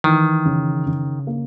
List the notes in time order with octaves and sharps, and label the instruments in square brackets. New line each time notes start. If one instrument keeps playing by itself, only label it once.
[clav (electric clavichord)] D#3 [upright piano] E3
[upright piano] C#3
C#3
A#3